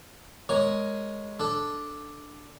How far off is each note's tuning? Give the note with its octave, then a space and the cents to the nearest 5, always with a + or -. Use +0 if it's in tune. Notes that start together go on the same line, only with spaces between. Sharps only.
G#3 +0 A#4 +0 C#5 +0
D4 +0 A4 +0